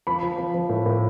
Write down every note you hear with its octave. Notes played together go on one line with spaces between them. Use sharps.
F3 B5
F3
F3
F3
A2
A2